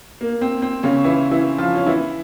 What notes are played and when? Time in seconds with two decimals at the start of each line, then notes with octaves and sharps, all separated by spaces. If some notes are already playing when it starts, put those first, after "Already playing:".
0.21 A#3
0.41 C4
0.62 C4
0.83 C#3 C#4
1.04 E3 E4
1.31 E3 E4
1.58 F3 F4
1.75 C#4
1.86 E3 E4